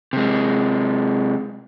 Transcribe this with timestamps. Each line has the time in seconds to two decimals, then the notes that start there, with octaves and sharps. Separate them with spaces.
0.13 C3 G#3